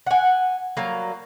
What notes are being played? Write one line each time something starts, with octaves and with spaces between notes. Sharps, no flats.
F#5 G#5
F#3 G3 A#3